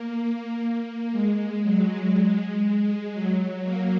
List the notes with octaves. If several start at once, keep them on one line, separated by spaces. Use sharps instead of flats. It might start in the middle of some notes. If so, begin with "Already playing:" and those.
Already playing: A#3
A#3
G#3
F#3
G#3
F#3
A#3